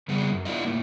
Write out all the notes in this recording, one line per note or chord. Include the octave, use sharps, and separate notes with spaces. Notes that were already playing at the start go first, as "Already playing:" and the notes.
C#3 G3 B3 G#4
F#2
B3 D4 E4 F4 D#5
A2 A#3 E4